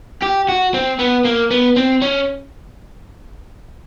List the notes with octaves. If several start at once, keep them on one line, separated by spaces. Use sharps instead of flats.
G4
F#4
C4
B3
A#3
B3
C4
C#4